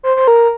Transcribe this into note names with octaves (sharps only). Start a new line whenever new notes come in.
C5
C5
A#4